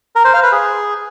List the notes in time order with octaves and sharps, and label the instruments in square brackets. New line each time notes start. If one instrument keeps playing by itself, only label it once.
[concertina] A#4
C5
F5
B4
G#4